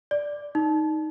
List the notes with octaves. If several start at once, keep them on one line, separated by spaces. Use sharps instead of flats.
D5
D#4